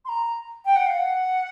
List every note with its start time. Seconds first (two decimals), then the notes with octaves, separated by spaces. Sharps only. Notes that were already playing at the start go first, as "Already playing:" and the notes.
0.05 C6
0.08 A#5
0.65 G5
0.76 F#5
0.86 F5
0.98 F#5